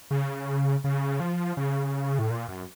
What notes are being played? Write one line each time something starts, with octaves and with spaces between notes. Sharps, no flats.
C#3
C#3
F3
C#3
A2
A#2
F#2